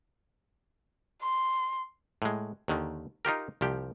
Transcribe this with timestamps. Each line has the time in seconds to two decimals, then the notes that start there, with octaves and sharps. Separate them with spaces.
1.22 C6
2.22 A2 G#3
2.68 D#2 D3 D#3
3.25 D#4 F4 G4 A#4
3.61 C2 F3 G4